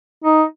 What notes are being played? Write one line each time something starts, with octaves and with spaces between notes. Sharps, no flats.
D#4